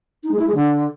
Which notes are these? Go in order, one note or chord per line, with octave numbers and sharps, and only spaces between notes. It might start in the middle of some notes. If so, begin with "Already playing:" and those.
D#4
G#3
E4
G#3
D3